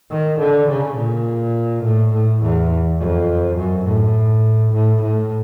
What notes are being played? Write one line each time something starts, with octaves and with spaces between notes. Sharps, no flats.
D#3
D3
C#3
A#2
A2
A2
E2
F2
F#2
A2
A2
A2